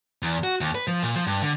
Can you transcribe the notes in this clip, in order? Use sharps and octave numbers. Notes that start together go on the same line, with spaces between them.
E2
F#4
D#2
B4
F3
A#2
F3
G2
D3